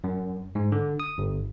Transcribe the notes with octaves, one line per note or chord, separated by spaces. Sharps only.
F#2
G#2
D3
D#6
G1